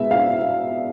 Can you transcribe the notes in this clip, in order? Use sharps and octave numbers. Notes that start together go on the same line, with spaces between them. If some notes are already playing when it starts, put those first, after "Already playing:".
Already playing: B2 G#3 B3 E5
F5